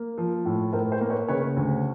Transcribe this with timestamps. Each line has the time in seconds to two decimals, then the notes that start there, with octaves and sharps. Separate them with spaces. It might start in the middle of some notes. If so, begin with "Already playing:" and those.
Already playing: A#3
0.18 F3
0.45 A2
0.73 A2 A#4 C5
0.92 A#4 C5
1.01 A#3
1.10 B4 C#5
1.28 C#3 B4 C#5
1.57 D2